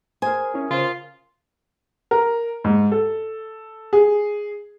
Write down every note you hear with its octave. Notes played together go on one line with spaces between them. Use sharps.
G#4 A#4 C5 G#5
C#4 E4
C#3 C#4 F4 C5
A#4
G#2
A4
G#4